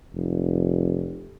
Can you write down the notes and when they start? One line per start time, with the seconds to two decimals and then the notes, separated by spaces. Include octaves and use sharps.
0.13 F1